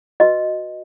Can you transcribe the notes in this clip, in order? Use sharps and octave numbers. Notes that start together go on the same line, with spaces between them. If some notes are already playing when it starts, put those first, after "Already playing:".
F#4 B4 D#5